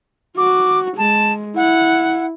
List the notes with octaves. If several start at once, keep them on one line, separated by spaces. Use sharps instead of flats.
F#4 D6
G#3 A5
E4 F#5